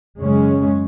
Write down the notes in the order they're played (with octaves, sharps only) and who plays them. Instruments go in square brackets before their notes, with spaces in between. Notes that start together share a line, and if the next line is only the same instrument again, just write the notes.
[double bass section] F#2 C#3 G#3 C#4